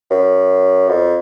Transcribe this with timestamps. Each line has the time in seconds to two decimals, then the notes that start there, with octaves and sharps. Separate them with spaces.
0.11 F#2
0.89 F2